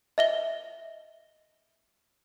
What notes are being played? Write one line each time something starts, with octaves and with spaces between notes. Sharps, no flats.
D#5 E5 G7